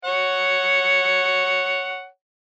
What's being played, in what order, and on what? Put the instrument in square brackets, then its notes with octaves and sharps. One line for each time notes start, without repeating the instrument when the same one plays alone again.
[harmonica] C#5 F#5